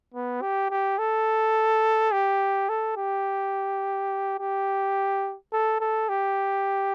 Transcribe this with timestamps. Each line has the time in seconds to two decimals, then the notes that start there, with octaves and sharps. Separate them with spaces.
0.14 B3
0.42 G4
0.71 G4
0.99 A4
2.12 G4
2.69 A4
2.97 G4
4.39 G4
5.53 A4
5.80 A4
6.09 G4